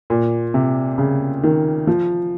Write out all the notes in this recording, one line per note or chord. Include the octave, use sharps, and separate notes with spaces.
A#2
C3
C#3
D#3
F3